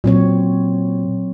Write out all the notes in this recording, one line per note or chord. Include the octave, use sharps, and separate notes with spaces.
A#2 F#3 C4 C#5